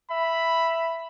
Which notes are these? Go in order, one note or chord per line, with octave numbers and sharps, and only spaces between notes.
E5 B5